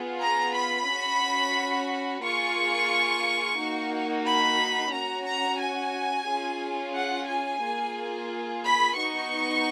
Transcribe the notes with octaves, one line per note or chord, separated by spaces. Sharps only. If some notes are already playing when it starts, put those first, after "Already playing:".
Already playing: B3 F4 G#4
A#5
B5
C#4 F#4
A#3 F4 G#4 C#6
A#3 D#4 F#4
B5
C#4 F#4 A#5
A#5
G#5
C#4 F4 G#4
F#5
G#5
A#3 F4 G#4
B5
B3 D#4 F#4 C#6